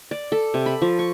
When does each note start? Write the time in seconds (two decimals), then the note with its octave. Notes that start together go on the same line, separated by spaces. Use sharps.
0.11 D5
0.32 A4
0.54 C3
0.66 B5
0.82 F3
0.99 C#6